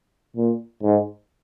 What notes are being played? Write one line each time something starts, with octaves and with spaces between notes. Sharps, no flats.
A#2
G#2